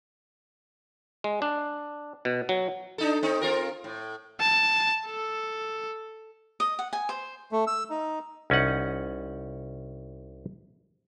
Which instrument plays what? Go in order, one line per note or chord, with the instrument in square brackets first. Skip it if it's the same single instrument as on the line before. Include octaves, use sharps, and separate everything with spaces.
[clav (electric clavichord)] G#3
D4
B2
F#3
[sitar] D4 D#4 A4
C4 D#4
C4 F4 A#4
A2
[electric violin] A5
A4
[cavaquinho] D#5
F#5
G#5
C5
[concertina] A3
E6
D#4
[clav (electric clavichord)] C2 C#4 D#4 F#5